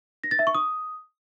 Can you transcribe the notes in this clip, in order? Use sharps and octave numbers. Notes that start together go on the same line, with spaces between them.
A#6
A6
E5
C#6
D#6